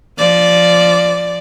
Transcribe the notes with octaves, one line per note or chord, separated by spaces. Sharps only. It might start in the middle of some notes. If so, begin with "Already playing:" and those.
F3 D5